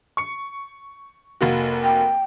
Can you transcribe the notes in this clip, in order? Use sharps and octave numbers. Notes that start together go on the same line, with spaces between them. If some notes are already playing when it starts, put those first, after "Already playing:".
C#6 C#7
F1 A#3 F#4
G5